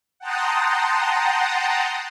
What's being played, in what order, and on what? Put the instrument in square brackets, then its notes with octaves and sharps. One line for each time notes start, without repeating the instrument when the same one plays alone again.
[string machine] F#5 G5 A5 A#5 C6 D#6